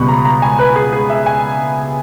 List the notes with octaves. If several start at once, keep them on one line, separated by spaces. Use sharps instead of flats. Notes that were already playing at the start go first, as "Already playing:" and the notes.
Already playing: C#2 B2 G3 B3 B5 C#6
A#5
A#5
G#5
B4
G#4
G#4
E5
G#5